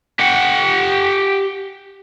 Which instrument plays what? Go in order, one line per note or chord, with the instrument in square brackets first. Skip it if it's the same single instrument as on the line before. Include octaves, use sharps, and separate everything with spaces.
[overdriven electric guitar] G4 F#5